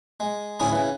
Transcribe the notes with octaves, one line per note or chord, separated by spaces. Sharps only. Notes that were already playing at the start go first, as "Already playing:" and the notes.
G#3
D2 A2 C#4 G#4 G#5 B5
C#3 E3